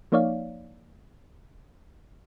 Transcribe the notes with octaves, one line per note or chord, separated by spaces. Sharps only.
F3 A#3 D#4 C#5 D5 F5